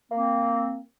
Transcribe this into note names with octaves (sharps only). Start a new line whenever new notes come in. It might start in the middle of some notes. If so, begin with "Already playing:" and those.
A#3 C4